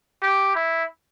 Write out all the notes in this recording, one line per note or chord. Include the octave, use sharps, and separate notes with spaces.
G4
E4